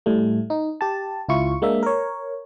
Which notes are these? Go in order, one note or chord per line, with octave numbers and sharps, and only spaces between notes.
A2 G3 A3
D#4
G4 A5
C#2 E4 F4 C#6
G#3 A#3 D4 E5
A#4 C#5